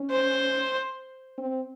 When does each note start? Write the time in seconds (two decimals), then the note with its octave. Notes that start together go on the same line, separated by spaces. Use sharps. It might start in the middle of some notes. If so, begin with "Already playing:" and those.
Already playing: C#4
0.11 C5
1.38 C4